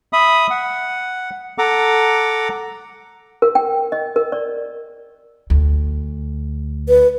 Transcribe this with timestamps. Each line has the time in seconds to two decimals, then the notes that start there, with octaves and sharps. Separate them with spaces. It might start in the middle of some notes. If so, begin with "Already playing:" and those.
0.13 E5 B5 D#6
0.50 F#5
1.58 A4 F#5 A#5 D6
3.42 A#4
3.55 G5
3.92 D#5
4.16 A#4
4.32 D5
5.50 D2
6.88 B4